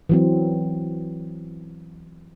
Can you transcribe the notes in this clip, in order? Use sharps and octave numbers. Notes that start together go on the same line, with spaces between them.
E3 F#3 C4